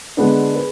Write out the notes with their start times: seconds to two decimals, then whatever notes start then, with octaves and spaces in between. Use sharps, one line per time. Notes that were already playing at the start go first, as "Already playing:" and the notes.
0.17 D3 G#3 B3 D4
0.56 G#4 B4